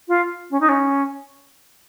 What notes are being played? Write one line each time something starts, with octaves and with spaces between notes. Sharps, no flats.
F4
C#4
D#4
C#4